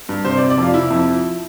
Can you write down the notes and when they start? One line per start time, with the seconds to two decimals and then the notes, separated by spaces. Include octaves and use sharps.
0.09 G2
0.25 C3 C5
0.37 D5
0.41 C3
0.50 D5
0.58 F2 F4
0.74 C3 E4
0.90 F2
1.08 F3